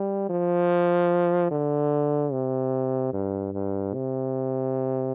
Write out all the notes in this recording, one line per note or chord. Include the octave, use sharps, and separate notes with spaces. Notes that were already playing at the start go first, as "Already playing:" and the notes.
Already playing: G3
F3
D3
C3
G2
G2
C3